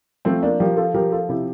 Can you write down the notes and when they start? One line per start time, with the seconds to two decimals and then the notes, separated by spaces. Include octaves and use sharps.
0.25 F3 A3 C4
0.43 A#3 D4
0.60 F3 G4 A#4
0.77 F4 A4
0.94 F3 G4 A#4
1.12 F4 A4
1.29 C3 E4 G4